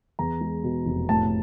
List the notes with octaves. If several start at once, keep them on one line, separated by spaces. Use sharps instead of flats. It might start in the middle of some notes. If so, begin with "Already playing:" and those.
E2 A#5
G#3
B2
F1
A2 A5